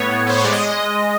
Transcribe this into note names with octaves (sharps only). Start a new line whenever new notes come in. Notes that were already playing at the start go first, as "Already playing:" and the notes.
Already playing: A2 B3 C#5
A2
B3 C5
C#5
G#3 D5
D#5